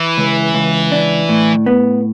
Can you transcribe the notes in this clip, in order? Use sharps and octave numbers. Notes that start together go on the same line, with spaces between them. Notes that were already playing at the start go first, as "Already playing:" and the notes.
Already playing: E3
C#2
C#2
D4
A2
B3